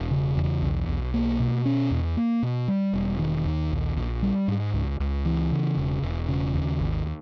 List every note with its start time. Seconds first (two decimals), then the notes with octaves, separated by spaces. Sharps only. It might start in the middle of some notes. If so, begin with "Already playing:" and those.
Already playing: E1
0.11 C#3
0.37 E2
0.62 B1
0.89 B1
1.14 A#3
1.40 B2
1.66 C#4
1.91 E2
2.17 A#3
2.43 B2
2.68 G3
2.93 E1
3.19 D#3
3.45 D#2
3.72 A#1
3.97 A#1
4.23 G3
4.48 G#2
4.74 C#2
5.00 C#2
5.25 E3
5.52 C#3
5.77 E1
6.02 E1
6.28 C#3
6.54 D#2
6.80 G#1